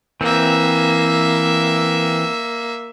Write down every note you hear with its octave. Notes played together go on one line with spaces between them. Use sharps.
E3 A#3 C4 E5